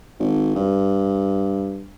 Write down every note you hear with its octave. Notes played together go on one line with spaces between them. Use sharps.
G#1
G2